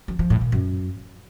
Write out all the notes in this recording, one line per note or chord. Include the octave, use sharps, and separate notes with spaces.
F#3
F3
A2
A#2
F#2